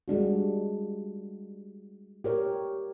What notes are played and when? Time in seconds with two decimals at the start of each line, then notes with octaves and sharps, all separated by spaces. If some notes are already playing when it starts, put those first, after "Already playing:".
0.08 G3 G#3 D4 F#4
2.24 G4 A#4 C#5